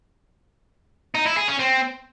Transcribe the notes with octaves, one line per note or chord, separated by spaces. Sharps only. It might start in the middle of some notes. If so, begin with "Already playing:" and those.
D#4
E4
G#4
C#4
C4